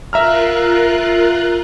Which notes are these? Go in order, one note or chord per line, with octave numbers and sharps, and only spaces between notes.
F4 A#4 E5 A#5 F6 F#6